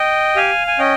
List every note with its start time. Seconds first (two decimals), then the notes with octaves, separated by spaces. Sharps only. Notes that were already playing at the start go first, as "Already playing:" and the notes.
Already playing: D#5 G5
0.36 G4 F5 G#5
0.67 G#5
0.79 C#4 D#5 G5